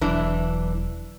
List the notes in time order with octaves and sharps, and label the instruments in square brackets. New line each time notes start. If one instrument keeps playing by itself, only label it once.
[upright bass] E1 F#3 [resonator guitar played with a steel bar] E3 D4